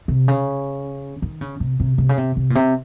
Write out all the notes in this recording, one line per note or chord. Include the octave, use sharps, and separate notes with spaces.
C3
C#3
D#3
C#3
C3
C3
C3
C#3
C3
C3
A#2
C3